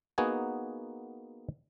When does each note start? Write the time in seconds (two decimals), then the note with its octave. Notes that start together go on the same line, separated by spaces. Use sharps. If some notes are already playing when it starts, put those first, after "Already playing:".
0.18 A#3 B3 D#4 F#4 G#4 G#5